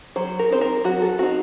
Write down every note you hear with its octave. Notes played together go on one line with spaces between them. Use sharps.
F#3 C5
A#4
C4 D#4 C5
A#4
F#3 F#4
A4
C4 D#4 F#4